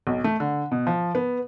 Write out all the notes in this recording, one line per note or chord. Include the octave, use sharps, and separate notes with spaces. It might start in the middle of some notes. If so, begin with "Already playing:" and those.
B1
A3
D3
B2
F3
B3